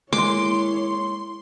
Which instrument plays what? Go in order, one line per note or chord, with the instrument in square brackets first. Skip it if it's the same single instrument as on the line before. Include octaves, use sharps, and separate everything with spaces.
[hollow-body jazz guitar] G#3 A#3 [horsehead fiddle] E4 C#5 [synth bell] C6 [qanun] D6